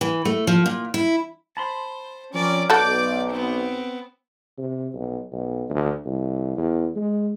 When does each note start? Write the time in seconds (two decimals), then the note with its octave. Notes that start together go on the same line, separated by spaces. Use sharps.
0.01 E3
0.25 A3
0.47 F3
0.66 A#2
0.94 E4
1.57 C5 A5 B5 C6
2.33 F3 C4 C#4 A#4 D5
2.70 B1 F#4 A4 D5 D6 G6
3.29 B3 C4
4.58 C3
4.95 B1
5.32 B1
5.70 D2
6.06 C2
6.57 E2
6.96 G#3